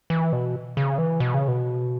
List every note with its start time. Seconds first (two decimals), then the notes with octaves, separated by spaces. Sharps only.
0.10 E3
0.33 B2
0.77 C#3
0.98 E3
1.20 B2
1.34 C#3
1.48 B2